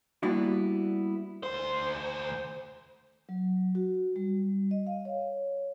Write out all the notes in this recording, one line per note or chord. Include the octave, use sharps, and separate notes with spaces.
G3 A#3 B3 D4 E4 F#4
D2 C5
F#3
F#4
G3
D#5
F5
C#5